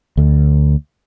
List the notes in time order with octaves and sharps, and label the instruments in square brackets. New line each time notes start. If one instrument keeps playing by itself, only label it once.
[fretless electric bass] D2